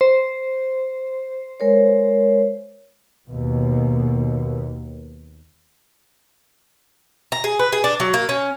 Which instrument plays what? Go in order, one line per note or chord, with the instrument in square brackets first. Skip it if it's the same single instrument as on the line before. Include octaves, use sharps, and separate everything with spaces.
[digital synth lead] C5
[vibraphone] G#3 A#4 C#5
[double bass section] D#2 B2
[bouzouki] A#5
G#4
B4
G#4
D4
F#3
A#3
C#4